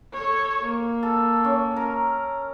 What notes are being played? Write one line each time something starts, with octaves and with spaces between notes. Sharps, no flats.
A4 C#5
A#3
A4
C#4
A#4